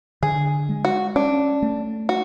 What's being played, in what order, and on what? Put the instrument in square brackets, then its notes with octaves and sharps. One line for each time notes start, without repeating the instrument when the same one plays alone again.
[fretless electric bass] D3 [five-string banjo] G#4
[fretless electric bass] G#3
[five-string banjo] F#4
[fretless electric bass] C#4 [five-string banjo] D4
[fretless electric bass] A3
[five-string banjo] F#4